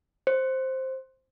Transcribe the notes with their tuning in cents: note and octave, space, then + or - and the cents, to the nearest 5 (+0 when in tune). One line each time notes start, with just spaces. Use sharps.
C5 +5